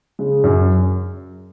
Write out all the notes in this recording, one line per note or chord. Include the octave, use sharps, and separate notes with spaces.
C#3 G#3
F#2